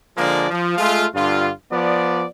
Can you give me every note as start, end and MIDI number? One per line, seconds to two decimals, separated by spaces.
0.16 0.45 50
0.16 0.45 53
0.16 0.45 56
0.16 0.45 58
0.16 0.45 74
0.49 0.77 53
0.77 1.05 56
0.77 1.05 57
0.77 1.05 65
1.15 1.48 43
1.15 1.48 50
1.15 1.48 65
1.71 2.24 53
1.71 2.24 59
1.71 2.24 74